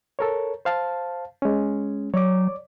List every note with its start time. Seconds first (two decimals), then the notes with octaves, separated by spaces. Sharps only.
0.19 A4 A#4 C#5
0.65 C5 F5 A5
1.42 G#3 C#4
2.14 F#3 C#5 D5 D6